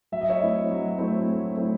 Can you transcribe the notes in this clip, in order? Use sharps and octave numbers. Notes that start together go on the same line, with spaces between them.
F#3 E5
D#5
C#5 E5
A3 C4 E4
F#3
A3 C4 E4
F#3
A3 C4 E4